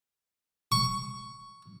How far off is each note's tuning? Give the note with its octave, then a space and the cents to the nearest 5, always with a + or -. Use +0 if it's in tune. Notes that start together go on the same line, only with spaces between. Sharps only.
C#6 +5